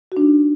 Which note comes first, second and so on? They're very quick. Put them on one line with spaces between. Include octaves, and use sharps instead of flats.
F#4 D4 D#4